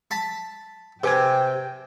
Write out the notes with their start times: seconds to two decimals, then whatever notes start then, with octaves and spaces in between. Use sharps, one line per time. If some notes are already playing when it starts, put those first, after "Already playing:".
0.11 A5 B5
1.04 C3 B4 G5 G#5 G#6